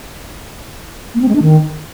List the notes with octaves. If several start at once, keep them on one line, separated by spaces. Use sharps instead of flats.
A#3
C4
G#3
D4
D#3